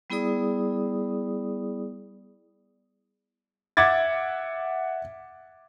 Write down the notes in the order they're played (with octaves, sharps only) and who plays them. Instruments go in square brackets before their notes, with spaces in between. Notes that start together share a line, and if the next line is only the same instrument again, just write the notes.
[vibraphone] G3 B3 E4 G#4 D5 D#6
[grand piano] E5 F#5 D6 G#6 A6